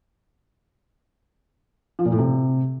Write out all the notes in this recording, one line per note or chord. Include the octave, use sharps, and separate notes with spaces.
F3
A#2
A2
C3